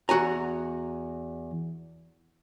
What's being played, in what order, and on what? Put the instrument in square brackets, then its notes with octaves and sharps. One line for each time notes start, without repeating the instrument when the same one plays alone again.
[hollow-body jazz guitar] E2 F#4 G#5 A#5